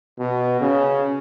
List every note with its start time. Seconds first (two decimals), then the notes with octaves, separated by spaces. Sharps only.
0.19 B2
0.61 C#3